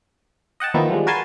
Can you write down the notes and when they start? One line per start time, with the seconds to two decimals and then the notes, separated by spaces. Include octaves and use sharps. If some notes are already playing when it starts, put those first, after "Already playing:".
0.60 D#5 F#5 G5 A5
0.74 D#3 F3 A#3 B3 E4
0.90 F3 G3 G#3
1.07 F#4 A#4 B4 G#5 A5 C6